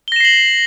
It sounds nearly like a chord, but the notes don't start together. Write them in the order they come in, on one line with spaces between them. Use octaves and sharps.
G7 A#6 E7 C7 F#7